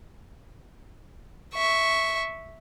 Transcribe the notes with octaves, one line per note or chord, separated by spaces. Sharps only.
E5 C#6